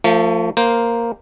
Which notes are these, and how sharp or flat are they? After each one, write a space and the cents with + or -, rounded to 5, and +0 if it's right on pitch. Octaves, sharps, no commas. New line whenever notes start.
F3 +0 A3 +35
A#3 +0 C5 +0